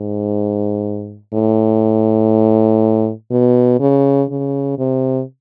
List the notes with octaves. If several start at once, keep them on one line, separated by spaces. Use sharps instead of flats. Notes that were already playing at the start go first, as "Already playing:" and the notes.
Already playing: G#2
A2
B2
C#3
C#3
C3